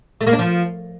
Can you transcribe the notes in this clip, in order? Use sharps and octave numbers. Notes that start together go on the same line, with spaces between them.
A3
A#3
D4
F3